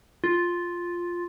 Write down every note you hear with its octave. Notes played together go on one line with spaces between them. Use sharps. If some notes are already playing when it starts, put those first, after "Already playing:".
F4